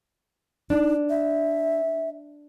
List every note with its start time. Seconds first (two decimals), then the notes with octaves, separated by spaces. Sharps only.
0.70 D4 D#4
1.10 E5